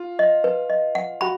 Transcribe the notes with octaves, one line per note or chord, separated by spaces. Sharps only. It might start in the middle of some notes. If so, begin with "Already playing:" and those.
Already playing: F4
D#5
B4
D#5
F#5
F#4 B5